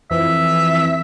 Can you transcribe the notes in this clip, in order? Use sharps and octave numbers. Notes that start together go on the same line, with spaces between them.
F2 E3 E5